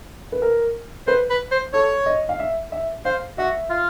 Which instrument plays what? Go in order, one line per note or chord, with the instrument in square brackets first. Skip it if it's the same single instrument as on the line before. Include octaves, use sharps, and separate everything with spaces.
[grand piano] B4
A#4
[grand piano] B4 [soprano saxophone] C5
[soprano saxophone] B4
C5
[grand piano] A4 [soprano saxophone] C#5
[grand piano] D#5
F5
E5
E5
[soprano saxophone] C5 [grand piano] F5
[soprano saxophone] F#4 [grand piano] E5
[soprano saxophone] F4